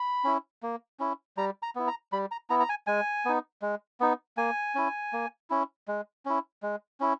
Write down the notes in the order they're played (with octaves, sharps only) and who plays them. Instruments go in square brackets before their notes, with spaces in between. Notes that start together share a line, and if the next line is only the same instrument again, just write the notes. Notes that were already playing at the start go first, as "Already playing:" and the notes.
Already playing: [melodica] B5
C#4 E4
A#3
C#4 E4
G3 A#5
A#5
B3 E4
A#5
G3 B5
A#5
B3 E4 A#5
A#5
G#5
G#3 G#5
B3 D#4
G#3
B3 D#4
A#3 G#5
C#4 E4
A#3
C#4 E4
G#3
C#4 E4
G#3
C#4 E4